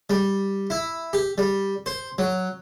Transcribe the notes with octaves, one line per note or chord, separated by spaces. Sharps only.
G3
E4
G4
G3
C5
F#3